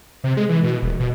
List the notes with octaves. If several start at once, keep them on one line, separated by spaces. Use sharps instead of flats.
C3
G#3
E3
B2
D#1
B2